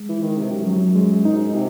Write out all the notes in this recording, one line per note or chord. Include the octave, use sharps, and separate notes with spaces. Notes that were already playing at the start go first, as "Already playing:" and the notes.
Already playing: G#3
E3
D#3
C3
F#2
F#3
G#3
G#2 D#4
C3